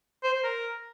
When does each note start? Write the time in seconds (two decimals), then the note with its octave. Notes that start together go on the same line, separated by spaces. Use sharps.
0.24 C5
0.34 C5
0.44 A#4